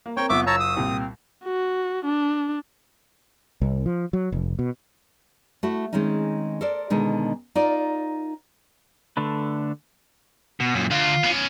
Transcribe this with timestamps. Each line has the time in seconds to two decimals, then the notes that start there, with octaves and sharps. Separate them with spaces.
0.06 A#3
0.17 C4 A#4 C#5 G5
0.29 F#1 B3 F4 E5 C#6 D6
0.47 C#5 A5 A#5 E6
0.60 D#6
0.77 C2 A#2 C4
1.44 F#4
2.05 D4
3.61 C2
3.86 F3
4.13 F#3
4.32 F1
4.59 B2
5.63 A3 E4 F#4
5.93 D#3 G#3 C4 C#4 D#4
6.61 A4 A#4 C5 D5
6.90 B2 D3 D#3 G#3 D#4
7.55 D#4 F4 A#4 D5
9.17 D3 A3 D4 B4
10.60 B2
10.74 F#2 A#2
10.91 D2 F4
11.24 B3 C#4